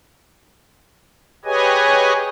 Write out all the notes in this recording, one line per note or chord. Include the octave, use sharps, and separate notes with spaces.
G4 G#4 B4 C#5 D#5 G#5